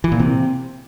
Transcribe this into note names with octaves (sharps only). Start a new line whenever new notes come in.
E3
A#2
C3